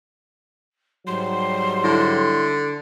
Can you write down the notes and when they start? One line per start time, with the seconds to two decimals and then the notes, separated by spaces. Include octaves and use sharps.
1.07 G#2 F#3 G3 C6
1.84 D3 E4